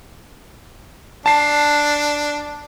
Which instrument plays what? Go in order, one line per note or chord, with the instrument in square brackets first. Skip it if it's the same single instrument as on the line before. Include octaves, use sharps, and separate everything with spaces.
[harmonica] D4 [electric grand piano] A5 C7